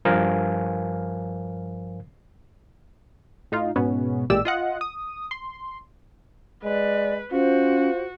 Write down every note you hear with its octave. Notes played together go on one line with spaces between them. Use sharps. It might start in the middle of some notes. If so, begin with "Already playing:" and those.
G2 F3 A#4 C5 F5 G#5
A2 D#4 F4
G#2 B2 B3 C#4
A1 A#2 G#3 G4 D5 E6
F4 D#5 F#5
D#6
C6
G#3 B4 D5
C#4 F4 F#4 C5